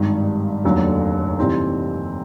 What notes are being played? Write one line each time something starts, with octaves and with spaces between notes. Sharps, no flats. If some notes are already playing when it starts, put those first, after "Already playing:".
Already playing: G#1 G2 D#3
F1 D#2 D3 F#3
C3 E3 G3 C4 D#4